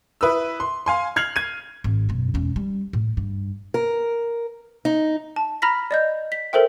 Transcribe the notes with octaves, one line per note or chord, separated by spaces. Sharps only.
E4 B4 D#6 E6
C6
F5 G#5 C6
F6 G#6 C7 F7 F#7
G#6 D#7
G#1
F#2 B2
E1 C#4
G3
A2
G2
A#4
D#4
A5
A#5 B5 F6 A#6 B6
D5 D#5 G6
B6
A4 A#4 C5 E5 G5